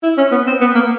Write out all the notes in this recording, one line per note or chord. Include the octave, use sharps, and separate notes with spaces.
E4
C#4
B3
C4
B3
A#3